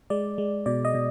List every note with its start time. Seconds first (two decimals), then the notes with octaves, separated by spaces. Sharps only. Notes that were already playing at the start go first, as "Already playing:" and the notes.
0.10 G#3 D5
0.38 G#3
0.66 B2 D5
0.85 D#5
0.94 B2